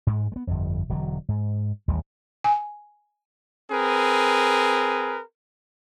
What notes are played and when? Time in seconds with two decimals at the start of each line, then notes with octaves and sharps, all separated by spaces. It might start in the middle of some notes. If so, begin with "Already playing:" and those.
0.07 G#2 G#3
0.32 G#3 B3
0.47 G1 F2
0.89 E1 D3 F#3
1.29 G#2
1.88 A1 D#2 G3
2.44 G#5
3.71 C4 G#4 A#4 B4